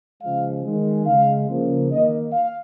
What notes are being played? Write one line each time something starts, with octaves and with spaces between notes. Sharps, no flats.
C#3 F3 G#3 F5
D#3 G#3
C#3 G#3 F5
C#3 F3 A#3
D#3 A#3 D#5
F5